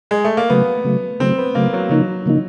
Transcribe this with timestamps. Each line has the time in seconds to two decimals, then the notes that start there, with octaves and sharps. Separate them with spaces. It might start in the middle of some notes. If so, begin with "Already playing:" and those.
0.11 G#3
0.24 A3
0.37 A#3
0.50 C#3 F#3 A3 B3
0.84 C#3 F#3 A3
1.20 C#3 F#3 A3 C4
1.38 B3
1.55 C#3 F#3 A3 A#3
1.73 F#3
1.89 C#3 F3 F#3 A#3 D#4
2.26 C#3 F3 A#3 D#4